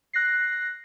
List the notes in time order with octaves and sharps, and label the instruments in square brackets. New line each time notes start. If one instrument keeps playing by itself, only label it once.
[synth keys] F#6 A#6 C7